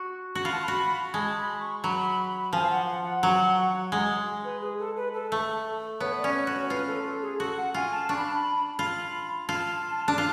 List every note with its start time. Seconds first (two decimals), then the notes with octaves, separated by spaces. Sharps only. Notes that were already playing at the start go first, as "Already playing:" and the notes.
Already playing: F#4
0.35 F#4
0.45 F4 B5
0.52 A5
0.60 C#6
0.64 F#4 B5
1.14 G#3 A5
1.37 B5
1.60 C#6
1.84 F#3 B5
2.53 F3 G#5
2.63 F5
2.70 F#5
2.88 F#5
3.05 F#5
3.23 F#3
3.92 G#3 F#5
4.44 B4
4.62 G#4
4.79 A4
4.96 B4
5.14 A4
5.32 A3
6.00 B3 C#5
6.19 D5
6.24 C#4
6.35 C#5
6.47 F#4
6.53 C#5
6.70 F4 B4
6.87 A4
7.06 A4
7.22 G#4
7.40 F#4 A4
7.57 F#5
7.74 F4 G#5
7.92 A5
8.09 D4 C#6
8.17 B5
8.25 A5
8.34 B5
8.79 F4 B5
9.48 F4 A5
10.08 D4
10.18 F4